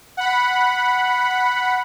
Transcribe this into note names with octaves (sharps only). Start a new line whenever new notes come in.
F#5 B5